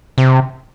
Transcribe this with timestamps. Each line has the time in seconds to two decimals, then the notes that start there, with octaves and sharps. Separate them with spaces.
0.18 C3